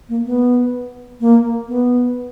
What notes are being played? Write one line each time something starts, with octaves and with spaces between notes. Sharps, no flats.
A#3
B3
A#3
B3